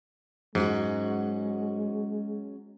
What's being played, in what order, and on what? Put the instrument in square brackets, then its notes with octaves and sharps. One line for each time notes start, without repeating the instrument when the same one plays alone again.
[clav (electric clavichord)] G#2 [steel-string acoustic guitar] F#3 C#4 F#4 [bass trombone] G#3